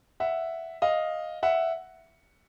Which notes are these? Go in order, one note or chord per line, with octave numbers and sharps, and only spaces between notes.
E5 F#5
D#5 F5
E5 F#5